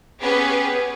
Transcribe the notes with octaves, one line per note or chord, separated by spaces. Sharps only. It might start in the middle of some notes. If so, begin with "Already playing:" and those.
B3 C#4 G4 G#4 B4